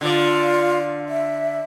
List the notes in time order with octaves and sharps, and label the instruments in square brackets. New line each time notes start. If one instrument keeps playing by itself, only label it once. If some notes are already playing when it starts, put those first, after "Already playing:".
[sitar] D3 D5 [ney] F4
[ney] E5